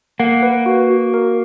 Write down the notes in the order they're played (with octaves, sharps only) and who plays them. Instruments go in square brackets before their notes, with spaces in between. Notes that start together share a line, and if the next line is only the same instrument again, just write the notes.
[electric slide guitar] A#3 [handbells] F#5
[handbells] B4
F#4
F#4
A#4